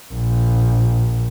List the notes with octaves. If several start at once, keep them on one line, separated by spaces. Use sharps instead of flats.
A#1